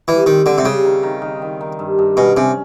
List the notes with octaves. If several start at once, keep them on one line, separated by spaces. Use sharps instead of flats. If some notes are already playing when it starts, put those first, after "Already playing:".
E3 G3
D#3 C4
D3 C4
C3
C#3 G3
D#3
D#3
D#3
D#3
D#3
G2
G2
B2 C#4
C3 C#4